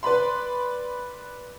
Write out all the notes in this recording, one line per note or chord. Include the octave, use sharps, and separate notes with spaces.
B4 D5 B5 C6